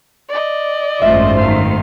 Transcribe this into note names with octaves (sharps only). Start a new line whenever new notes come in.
D5 D#5
G#1 F#2 G#3 A3 F4 C5 E5
D#3 A3 F5